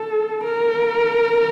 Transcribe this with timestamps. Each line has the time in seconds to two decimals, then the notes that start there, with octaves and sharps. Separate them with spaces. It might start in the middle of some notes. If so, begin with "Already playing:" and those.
Already playing: A4
0.44 A#4